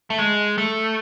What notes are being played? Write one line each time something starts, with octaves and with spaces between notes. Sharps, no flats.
A3
G#3
A3